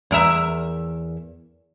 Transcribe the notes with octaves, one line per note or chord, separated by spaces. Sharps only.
E2 A#4 E5